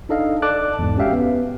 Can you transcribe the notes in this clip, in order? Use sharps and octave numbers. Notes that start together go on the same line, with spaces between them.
D4 D#4 A4 D#5 F5
A4 D5 A5 D6 F#6
E2 G#2
C#4 F#4 G4 E5 F5 G5
B3